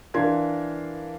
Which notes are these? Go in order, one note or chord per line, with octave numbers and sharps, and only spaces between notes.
E3 D4 A#4 F5 C6 G#6